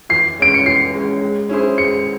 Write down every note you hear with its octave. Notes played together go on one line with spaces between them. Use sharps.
E3 C7
G#3 C#4 D7
C#7
E3 C7
G#3 C#4
G#3
C#4 E4 G#4 C5
G#3 C#7